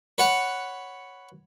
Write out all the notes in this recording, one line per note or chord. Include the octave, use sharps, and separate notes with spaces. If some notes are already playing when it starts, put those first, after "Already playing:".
B4 C#5 F#5